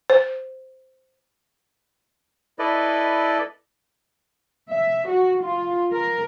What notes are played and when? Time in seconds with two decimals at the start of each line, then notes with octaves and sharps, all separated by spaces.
0.10 C5
2.59 E4 A4 B4 D5 D#5
4.70 E5
5.08 F#4
5.42 F4
5.91 A#4